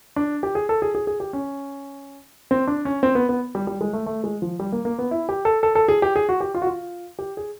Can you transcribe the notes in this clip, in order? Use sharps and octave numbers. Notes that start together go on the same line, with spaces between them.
D4
G4
G#4
A4
G#4
G#4
G#4
G4
C#4
C4
D4
C#4
C4
B3
B3
G3
G3
G#3
A3
A3
G#3
F3
G3
A#3
A#3
B3
E4
G4
A4
A4
A4
G#4
G4
G#4
F#4
G4
F4
F#4
F4
G4
G#4